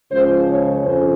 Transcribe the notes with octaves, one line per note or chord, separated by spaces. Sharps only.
C#2 C#3 F3 C5
C#5
F2 C#3 C5